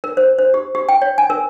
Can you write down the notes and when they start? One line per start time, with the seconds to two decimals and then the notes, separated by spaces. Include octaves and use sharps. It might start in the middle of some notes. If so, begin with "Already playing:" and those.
0.04 A#4
0.17 C5
0.39 C5
0.54 G4
0.75 G4
0.89 G5
1.02 C#5
1.18 G#5
1.30 A#4